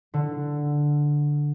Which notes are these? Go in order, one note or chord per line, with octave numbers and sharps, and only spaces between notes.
D3